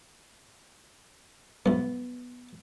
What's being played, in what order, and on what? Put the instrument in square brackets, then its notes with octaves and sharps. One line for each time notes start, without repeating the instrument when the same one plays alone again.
[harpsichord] B1 G2 [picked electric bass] B3